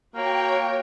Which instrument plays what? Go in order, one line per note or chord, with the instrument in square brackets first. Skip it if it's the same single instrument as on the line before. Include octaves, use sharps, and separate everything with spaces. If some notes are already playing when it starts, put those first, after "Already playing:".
[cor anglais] A#3 [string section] F#4 C#5 G5